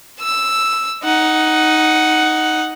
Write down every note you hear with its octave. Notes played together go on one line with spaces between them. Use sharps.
E6
D#4 F#5